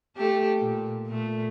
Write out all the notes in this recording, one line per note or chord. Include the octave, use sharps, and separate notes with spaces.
A3 G4 A4
A#2
A#2 A3